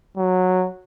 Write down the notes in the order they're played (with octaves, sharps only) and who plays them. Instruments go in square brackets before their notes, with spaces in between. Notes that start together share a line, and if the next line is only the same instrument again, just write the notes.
[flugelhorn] F#3